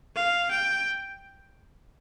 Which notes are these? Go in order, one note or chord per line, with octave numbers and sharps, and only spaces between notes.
F5
G5